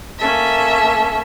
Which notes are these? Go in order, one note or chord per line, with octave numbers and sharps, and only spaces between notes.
A#3 C#4 A4 E5